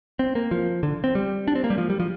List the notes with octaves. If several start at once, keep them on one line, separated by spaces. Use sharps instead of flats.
C4
A#3
F3
D3
C4
G3
D4
C4
A#3
G3
F3
G3
F3